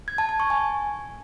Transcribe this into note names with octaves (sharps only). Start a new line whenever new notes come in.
G#6
A5
A5
C#6
G#5